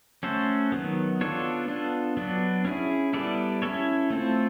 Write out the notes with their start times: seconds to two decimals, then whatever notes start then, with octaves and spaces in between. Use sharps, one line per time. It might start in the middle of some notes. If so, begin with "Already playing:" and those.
0.23 A3 C#4 F#4 A4 C5
0.72 D#3 F#3 B3
1.21 B3 D4 F4 A4 C#5
1.68 B3 D4 F4 A4
2.17 F#3 B3 D4
2.65 C#4 E4 G#4
3.13 G3 B3 E4 A4 D5
3.62 C#4 E4 A4 C#5
4.10 A3 C4 F4 A4